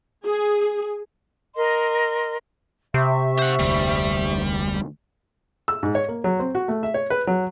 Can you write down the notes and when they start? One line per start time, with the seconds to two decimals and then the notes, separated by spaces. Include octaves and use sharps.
0.24 G#4
1.55 A#4 D#5 C6
2.94 C3 E5 C#6
3.39 C5 F#5
3.59 F1 D2 G3
5.68 E6
5.83 G#2
5.95 C#5
6.08 A#3
6.24 F#3
6.39 C4
6.55 F#4
6.68 A3
6.83 E5
6.94 C#5
7.10 B4
7.27 F#3